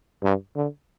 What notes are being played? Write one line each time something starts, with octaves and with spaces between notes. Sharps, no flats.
G2
D3